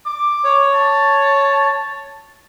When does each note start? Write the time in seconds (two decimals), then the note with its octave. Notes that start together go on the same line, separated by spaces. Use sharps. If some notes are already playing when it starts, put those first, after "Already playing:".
0.06 D6
0.44 C#5
0.75 A5